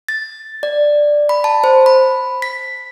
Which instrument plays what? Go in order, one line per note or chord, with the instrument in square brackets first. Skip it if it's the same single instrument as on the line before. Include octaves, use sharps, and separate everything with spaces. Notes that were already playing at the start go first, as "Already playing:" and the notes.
[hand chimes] A6
D5
B5
A5
C5
B5
B6